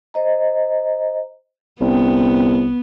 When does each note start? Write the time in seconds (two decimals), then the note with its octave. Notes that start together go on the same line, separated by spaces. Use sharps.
0.14 C5 D#5 A#5
1.81 C2 B3 C#4 G5